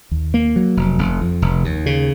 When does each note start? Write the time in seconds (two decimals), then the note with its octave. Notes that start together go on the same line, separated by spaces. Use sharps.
0.11 D#2
0.34 A#3
0.56 F#3
0.77 F1
0.98 F1
1.21 F2
1.42 F1
1.64 D#2
1.86 C#3